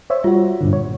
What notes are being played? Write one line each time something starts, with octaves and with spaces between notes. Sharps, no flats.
C5 C#5 E5
G3 F4 F#4
G2 A#2 D3
C#5